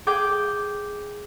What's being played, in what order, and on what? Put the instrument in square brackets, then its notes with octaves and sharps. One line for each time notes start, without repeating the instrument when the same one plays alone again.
[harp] G#4 G5 D6 G6